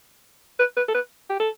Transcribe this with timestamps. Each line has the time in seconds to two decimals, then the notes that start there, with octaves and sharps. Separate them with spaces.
0.59 B4
0.77 B4
0.88 A4
0.94 B4
1.30 G4
1.40 A4